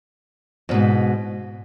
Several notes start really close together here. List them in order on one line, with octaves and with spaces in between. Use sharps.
F2 B2 G#2